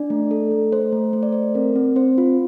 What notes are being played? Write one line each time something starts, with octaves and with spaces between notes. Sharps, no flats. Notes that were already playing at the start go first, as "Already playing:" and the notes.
Already playing: D4 D5
A3
A4
A3
A3 C5
A3
A3 C5
D5
A3 C5
C4 A#4
C4
C4 C5
F4